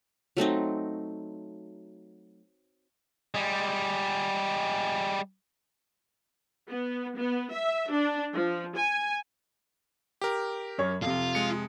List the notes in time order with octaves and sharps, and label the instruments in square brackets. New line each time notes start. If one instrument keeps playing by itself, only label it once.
[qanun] F#3 A3 C4 D#4
[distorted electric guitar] G3 G#3
[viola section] B3
B3
E5
D4
F3
G#5
[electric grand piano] G4 A#4
[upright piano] F#2 C#5
[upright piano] F2 C3 [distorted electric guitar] F4
[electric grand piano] G#3 C#7